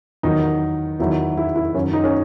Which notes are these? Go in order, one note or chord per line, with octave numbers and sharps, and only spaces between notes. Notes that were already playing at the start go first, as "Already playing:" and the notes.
E2 D#3 F#3 D#4
E2 D#3 F#3 E4
E4
E4
F#2 D#3 F#3 C#4
D#4
C#4